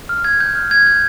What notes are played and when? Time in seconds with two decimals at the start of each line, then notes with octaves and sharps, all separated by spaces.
0.09 F6
0.24 G#6
0.40 G6
0.55 F6
0.71 G#6
0.87 G6